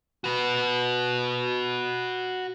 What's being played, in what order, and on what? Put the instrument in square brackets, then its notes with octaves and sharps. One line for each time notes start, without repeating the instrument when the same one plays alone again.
[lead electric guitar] F#4 B4